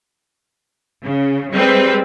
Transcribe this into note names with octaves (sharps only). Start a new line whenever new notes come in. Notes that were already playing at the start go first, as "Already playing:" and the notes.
C#3
G3 G#3 C4 B4